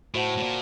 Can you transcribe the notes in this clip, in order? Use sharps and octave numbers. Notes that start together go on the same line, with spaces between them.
A2 F#4 C5 F#5 A5
A2
A#2